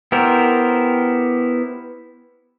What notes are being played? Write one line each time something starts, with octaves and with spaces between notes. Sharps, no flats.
B3 E4 G4 A#4 C5